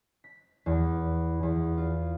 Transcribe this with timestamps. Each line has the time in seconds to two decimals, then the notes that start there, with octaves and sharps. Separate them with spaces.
0.24 B6
0.66 E2
1.43 E2
1.77 F4